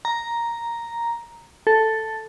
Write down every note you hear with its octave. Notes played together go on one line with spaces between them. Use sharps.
A#5
A4